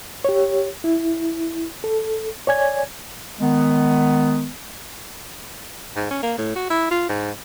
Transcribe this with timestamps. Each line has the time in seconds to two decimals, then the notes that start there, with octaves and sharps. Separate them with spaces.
0.25 G4 C#5
0.84 E4
1.84 A4
2.47 C#5 D5 G#5 G#6
3.40 D#3 G#3 B3
5.96 G#2
6.11 C#4
6.23 A#3
6.38 A2
6.55 F#4
6.70 E4
6.91 F4
7.09 G#2